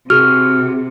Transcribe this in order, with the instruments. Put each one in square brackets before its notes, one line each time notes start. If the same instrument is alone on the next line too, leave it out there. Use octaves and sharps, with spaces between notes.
[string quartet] C3 [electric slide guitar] F#4 G#4 [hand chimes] F6